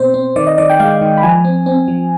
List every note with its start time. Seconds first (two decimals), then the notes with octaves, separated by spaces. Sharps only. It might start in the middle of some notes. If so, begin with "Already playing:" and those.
Already playing: B2 C4 C5
0.14 C4
0.36 D#3 D5
0.47 D#5
0.58 D#3 D5
0.70 G5
0.79 G#3 F5
1.01 D#3
1.18 B5
1.23 F3 G#5
1.44 C4
1.66 C4
1.88 F3